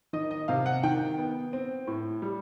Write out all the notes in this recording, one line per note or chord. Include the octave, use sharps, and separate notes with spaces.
D#3 D#5
D#5
C3 F5
F#5
D#3 G5
B3
C4
A2
G3